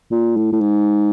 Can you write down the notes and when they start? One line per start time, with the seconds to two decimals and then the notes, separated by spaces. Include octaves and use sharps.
0.11 A#2
0.37 A2
0.52 A2
0.61 G#2